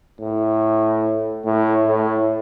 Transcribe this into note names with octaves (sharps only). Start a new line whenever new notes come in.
A2
A2
A2